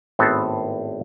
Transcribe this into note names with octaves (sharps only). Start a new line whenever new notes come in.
G#1 A2 B3 C4 A4 C5